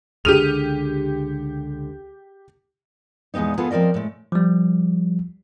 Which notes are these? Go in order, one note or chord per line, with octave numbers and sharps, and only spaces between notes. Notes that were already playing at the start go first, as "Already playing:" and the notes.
C#2 D3 G4 G#4 D#6 F6 D#7 F7
E2 A#2 G#3 B3 D#4
B3 F4 G#4 A4 B4
F3 C4 A#4 D5 D#5
A2 G#3
F3 G3